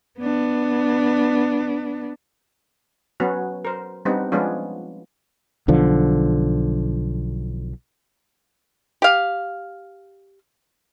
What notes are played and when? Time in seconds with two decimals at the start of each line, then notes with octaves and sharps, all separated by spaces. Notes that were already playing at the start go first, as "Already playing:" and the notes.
0.19 B3 D4
3.20 F#3 B3 C#4 F#4
3.65 A#4 C5
4.05 G3 B3 C4 D4 D#4
4.32 F3 G#3 B3 C#4 D4 F4
5.68 B1 D3 F3
9.02 G4 F5